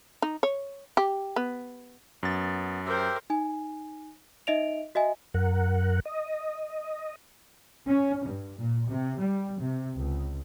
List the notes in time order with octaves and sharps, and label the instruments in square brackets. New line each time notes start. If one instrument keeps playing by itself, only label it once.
[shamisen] D#4
C#5
G4
B3
[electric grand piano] F#2 A6 [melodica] B3
[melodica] G4 E5 G5 [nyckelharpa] A#4 C5
[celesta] D#4 G#5
D#4 D#5 E5 D7 F7
F#4 D#5 E5 G#5
[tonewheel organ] F#2 A#4 F#5
D#5
[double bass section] C#4
G2
A#2
C3
G3
C3
C#2